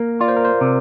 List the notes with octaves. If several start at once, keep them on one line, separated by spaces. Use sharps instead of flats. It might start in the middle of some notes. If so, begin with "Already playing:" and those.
Already playing: A#3 A#4
F4 D5
C5
A#4
C5
C3